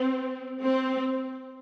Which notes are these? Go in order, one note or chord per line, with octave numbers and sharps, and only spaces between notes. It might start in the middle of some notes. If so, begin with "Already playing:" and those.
Already playing: C4
C4